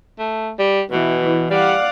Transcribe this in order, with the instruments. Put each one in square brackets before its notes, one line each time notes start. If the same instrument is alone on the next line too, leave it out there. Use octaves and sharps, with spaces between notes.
[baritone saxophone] A3
G3
[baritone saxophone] B2 [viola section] E3
[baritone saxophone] G3 [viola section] D5 F5 F#5